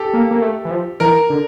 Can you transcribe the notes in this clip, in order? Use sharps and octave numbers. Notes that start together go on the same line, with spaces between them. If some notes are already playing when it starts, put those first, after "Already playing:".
Already playing: G4 A4
A#3
A#3
A3
E3
F3
E3 A#4
D3